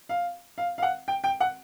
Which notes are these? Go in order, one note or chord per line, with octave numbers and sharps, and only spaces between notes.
F5
F5
F5
F#5
G5
G5
F#5